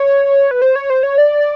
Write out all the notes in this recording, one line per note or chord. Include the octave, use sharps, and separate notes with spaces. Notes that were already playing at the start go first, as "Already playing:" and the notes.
Already playing: C#5
B4
C5
C#5
C5
C#5
D5